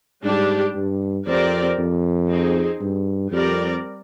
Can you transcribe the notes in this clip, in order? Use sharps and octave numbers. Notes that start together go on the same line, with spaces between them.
G#2 G3 D4 G4
G2
F2 C4 G4 A#4 D5
F2
C4 D#4 G#4
G2
F2 G3 C4 G4 A#4 D5